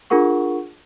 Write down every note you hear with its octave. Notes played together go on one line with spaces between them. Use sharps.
D4 F4 G#4 A#4 F#5 C#6